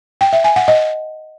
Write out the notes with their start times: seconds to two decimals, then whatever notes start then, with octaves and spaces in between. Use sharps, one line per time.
0.21 G5
0.33 E5
0.44 G#5
0.56 F#5
0.68 D#5